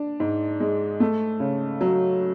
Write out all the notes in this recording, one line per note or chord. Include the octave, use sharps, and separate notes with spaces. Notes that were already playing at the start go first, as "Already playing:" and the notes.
Already playing: D4
G#2
G#3
A3
C#3
F#3